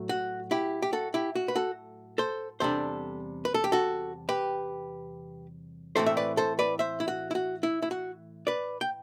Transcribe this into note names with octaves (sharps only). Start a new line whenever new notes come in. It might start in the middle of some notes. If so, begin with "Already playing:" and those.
Already playing: A2 F#3 A3
F#4
E4 G4
G4
F#4 A4
E4 G4
F#4
B4
F#4 A4
A4 C5
E2 C3 G3 D4 A4 C5
B4
A4
G4
F#4 A4
G4 B4
A2 E3 A3 C4 A4 C5
E5
B4 D5
A4 C5
B4 D5
C5 E5
E4
F#4
E4
F#4
E4
E4
F#4
B4 D5
G5